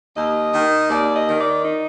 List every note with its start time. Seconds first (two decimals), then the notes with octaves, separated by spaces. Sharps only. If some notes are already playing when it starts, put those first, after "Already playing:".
0.16 D#2 D#5
0.54 D#3
0.90 D#2 D5
1.15 D#5
1.27 D#3
1.39 D5
1.65 D#4